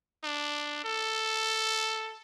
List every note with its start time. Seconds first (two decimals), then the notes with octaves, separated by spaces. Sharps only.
0.24 D4
0.84 A4